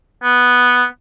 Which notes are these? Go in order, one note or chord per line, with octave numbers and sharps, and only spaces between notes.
B3